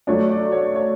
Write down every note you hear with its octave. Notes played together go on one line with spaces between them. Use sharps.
F#3 A3 D4 C#5
D5
C#5
C#5